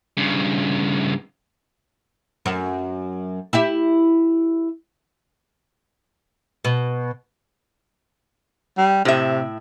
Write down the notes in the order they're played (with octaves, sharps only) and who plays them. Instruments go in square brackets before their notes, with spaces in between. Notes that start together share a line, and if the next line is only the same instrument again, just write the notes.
[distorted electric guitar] G2 C#3
[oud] F#2
E4 G4 E5
B2
[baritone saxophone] G3
[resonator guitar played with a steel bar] A2 E5 [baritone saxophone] C3